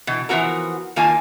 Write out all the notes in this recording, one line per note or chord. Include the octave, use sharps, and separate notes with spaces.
B2 E3
E3 F3 B3 F#4 A#4
D#3 A#3 F4 G#5 A5